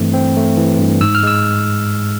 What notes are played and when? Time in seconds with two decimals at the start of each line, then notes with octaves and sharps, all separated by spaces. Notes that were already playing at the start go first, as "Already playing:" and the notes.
Already playing: G2 E3 A3 C4
0.14 C4
0.37 A3
0.57 E3
0.79 G2
1.01 G#2 E6
1.15 F6
1.23 G#3 E6